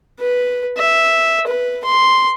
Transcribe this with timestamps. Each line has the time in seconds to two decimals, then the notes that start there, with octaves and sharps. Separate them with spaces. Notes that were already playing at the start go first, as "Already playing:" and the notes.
0.20 B4
0.77 E5
1.46 B4
1.84 C6